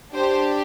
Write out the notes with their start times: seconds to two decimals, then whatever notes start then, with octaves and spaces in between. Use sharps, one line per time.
0.14 D4 G4 C5